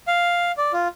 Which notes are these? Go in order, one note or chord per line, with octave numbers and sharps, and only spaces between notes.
F5
D5
F4